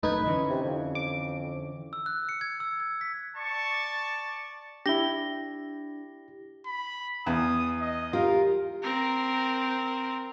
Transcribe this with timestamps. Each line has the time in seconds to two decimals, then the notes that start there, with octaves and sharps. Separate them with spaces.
0.03 A#1 F#2 A3 D#4 B4 G#6
0.26 D3 E3 C#4
0.50 C3
0.65 F2
0.95 D6
1.93 E6
2.06 F#6
2.29 C#7
2.41 G#6
2.60 E6
2.80 G#6
3.01 B6
3.36 D5 A5 C#6
4.86 D4 E4 G4 A#6 G7
6.66 B5
7.27 E2 D#6
7.81 D#5
8.13 F4 G4 A#4
8.83 C4 A#4